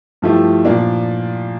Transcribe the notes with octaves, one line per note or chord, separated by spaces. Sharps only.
G2 F3 A3 E4 G4
A#2 F3 A#3 D4